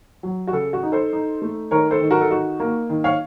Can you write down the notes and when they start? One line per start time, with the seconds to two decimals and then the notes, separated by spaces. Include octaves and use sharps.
0.23 F#3
0.47 F#4
0.53 C#3 A4
0.73 F#4
0.83 D#4
0.92 A4 C5
1.13 D#4
1.42 A3
1.71 D#3 A#4 C#5
1.91 A4 C5
2.01 D#3
2.11 F#4 A#4
2.21 A4
2.31 D#4 F#4
2.60 A#3
2.89 D#3
3.04 C#5 F5